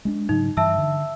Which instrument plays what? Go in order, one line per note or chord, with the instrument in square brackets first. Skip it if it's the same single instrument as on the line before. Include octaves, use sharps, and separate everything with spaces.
[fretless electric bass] G#3 C4 D4
[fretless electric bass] G#2 C#3 F#3 [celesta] D#4
[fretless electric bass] G2 E3 G3 [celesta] E5 A5 E6
[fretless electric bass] D3